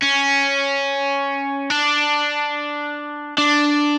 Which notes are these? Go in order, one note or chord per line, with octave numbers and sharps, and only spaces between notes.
C#4
D4
D4